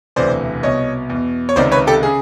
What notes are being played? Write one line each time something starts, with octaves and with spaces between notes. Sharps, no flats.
E1 D2 C3 E3 C5 D5
C2 B2 C#5 D#5
E2
B2
C#5
C#2 C3 D#3 C5 D5
B4 C#5
G4 A4
C#3 G#4